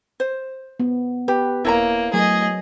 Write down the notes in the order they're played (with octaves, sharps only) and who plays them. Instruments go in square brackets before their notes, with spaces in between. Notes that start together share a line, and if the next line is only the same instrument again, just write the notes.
[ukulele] C5
[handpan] B3
[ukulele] G4 [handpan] B4
[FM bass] D#1 [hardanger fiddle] A#3 [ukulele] E4 C#5 A#5
[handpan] F#3 [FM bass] A3 [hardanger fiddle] G#4 D#5